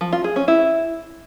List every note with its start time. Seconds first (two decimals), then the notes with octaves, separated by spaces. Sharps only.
0.01 F3
0.13 F4
0.24 G#4
0.36 C#4
0.48 E4